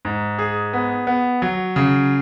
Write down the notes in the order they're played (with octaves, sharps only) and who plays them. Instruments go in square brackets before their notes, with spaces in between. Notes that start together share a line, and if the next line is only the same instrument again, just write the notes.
[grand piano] G#2
G#4
B3
B3
F#3
C#3